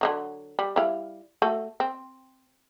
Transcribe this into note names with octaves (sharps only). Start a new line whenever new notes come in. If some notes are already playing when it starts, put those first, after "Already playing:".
D3 D#3 F#3
G3
G3 E4 F5
A3 F#4 A4
C4